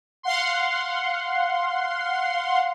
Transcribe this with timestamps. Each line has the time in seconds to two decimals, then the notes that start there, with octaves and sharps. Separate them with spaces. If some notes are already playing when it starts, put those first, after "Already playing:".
0.23 F5 F#5 C6